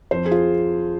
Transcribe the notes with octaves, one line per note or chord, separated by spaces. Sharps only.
F2 C5
G#4
F4